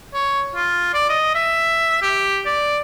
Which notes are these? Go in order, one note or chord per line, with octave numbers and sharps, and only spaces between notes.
C#5
F4
D5
D#5
E5
G4
D5